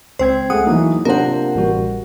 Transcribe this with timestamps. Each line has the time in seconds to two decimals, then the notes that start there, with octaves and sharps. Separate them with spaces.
0.19 C#2 C4 C5 G#6
0.50 G#3 A3 G#4 F#5 D#6
0.67 E3 F#3 A#3 D#4
1.05 C3 A#3 D4 F4 A#4 C5 F#5
1.55 A1 G3 F#4